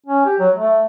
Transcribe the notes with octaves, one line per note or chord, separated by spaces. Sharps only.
C#4
G4
F#3
A3